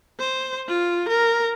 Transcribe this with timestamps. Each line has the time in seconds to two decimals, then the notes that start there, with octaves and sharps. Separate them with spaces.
0.19 C5
0.68 F4
1.08 A#4